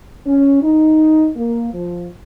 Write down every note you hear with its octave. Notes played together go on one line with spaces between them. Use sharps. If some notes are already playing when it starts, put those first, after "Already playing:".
C#4
D#4
A#3
F3